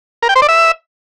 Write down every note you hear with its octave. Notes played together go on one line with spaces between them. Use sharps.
A#4
G5
C5
D5
E5